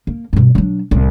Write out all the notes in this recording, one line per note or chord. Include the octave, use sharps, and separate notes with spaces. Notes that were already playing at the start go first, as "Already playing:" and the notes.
A#3
G2 B2
F#3 D4
C2 A2